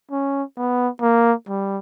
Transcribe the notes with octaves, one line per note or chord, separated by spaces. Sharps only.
C#4
B3
A#3
G3